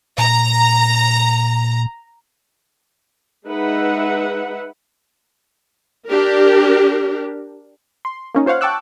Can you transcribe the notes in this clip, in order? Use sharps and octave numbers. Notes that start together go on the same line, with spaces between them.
A#2 A#5
G#3 D#4 B4 E5 F#5
D4 G4 A#4
C6
A#3 C#4 D#4
F4 C5 C#5 F5 F#5
G5 A5 C#6 D6 E6 F#6